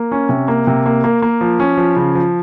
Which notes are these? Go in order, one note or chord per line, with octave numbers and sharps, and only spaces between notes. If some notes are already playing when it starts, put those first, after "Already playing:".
Already playing: A#3
C#4
C3
A#3
C3
A#3
A#3
A#3
F3
C#4
F3
C#3
F3